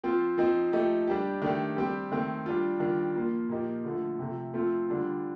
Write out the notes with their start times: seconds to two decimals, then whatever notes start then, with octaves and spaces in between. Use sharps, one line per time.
0.04 F3 C4 F4
0.38 F3 C4 D#4
0.73 F3 A3 D#4 G4
1.07 G3 D4 G4
1.42 D#3 A3 D4 G4
1.77 G3 C4 G4
2.12 D#3 A3 C4
2.46 G3 D4 F4
2.80 D#3 G3 D4 F4
3.15 F3 A#3 F4
3.49 A#2 F3 A#3 D#4 G4
3.85 D3 F3 A3
4.19 C3 F3 A3
4.53 F3 A3 C4 F4
4.88 D3 G3 D4 F4